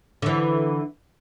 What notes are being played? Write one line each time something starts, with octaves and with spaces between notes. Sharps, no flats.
D3 E3